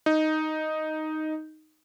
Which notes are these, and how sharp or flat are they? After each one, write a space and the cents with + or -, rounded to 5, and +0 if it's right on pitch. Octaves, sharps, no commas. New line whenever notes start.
D#4 +0